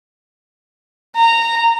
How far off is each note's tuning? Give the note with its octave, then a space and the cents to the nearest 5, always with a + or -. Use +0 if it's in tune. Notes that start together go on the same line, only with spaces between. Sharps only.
A#5 -15